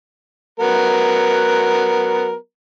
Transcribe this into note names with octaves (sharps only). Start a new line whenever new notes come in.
F#3 B3 A#4